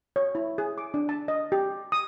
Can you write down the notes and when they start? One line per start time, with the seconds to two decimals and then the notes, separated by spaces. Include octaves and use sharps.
0.16 C#5
0.35 E4
0.58 G#4
0.78 D6
0.94 D4
1.09 A5
1.28 D#5
1.52 G4
1.92 D#6